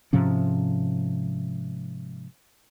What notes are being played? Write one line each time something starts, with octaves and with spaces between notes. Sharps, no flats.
G#2 C3 F3 C#4